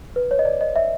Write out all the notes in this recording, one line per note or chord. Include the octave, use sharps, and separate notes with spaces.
B4
C#5
D#5
D5
D#5
E5